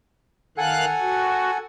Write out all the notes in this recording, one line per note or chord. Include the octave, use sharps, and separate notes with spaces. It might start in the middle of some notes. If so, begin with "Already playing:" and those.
D#3 A4 F5 F#5 G#5 F#6
F#4